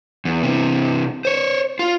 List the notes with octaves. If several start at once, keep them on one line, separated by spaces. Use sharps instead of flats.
E2
C3 E3
C5 C#5
F4